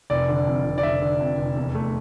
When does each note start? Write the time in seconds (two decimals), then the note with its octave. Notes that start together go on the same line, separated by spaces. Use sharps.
0.10 F1 D5
0.29 D3
0.47 F2
0.65 F1
0.78 D5
0.83 F1 E5
1.02 D3
1.20 F2
1.38 F1
1.56 E2
1.75 A3